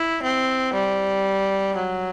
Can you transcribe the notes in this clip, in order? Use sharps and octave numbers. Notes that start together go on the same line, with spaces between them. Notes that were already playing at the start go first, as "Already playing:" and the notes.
Already playing: E4
C4
G3
F#3